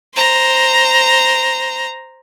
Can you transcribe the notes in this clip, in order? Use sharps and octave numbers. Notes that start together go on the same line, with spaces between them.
C5 A#5